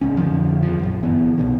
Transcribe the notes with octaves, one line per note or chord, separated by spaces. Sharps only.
D1 C#2 C#4
F2 D3 D#3 F3
E2 F3
A#1 F#2
G1 E3 B3
C2 B2 D#3